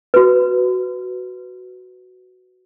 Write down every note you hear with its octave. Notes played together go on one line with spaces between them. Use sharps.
F#4 B4